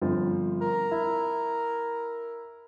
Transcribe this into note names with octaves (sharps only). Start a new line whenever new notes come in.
G1 F3 C4
A#4
E4